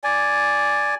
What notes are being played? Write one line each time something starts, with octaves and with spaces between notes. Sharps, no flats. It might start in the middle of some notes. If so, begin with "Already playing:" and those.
D5 G#5